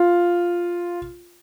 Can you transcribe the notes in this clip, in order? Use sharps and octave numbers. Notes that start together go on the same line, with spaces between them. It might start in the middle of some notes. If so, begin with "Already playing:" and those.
Already playing: F4